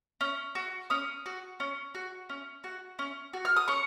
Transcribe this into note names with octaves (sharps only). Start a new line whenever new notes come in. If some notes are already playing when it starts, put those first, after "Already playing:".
C#4
F#4
C#4 D#6
F#4
C#4
F#4
C#4
F#4
C#4
F#4
F6
D#6
C#4 C#6